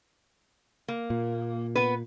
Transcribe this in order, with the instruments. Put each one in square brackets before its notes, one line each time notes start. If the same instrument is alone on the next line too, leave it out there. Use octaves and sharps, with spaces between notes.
[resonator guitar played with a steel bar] A#3
[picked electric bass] A#2
[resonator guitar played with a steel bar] B3 B4